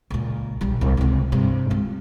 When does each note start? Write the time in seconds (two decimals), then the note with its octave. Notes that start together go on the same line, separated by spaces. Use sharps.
0.10 C#2 A#2
0.61 A#1 G3
0.81 C2
0.97 C#2 C3
1.32 G2 C3
1.70 G#3 F4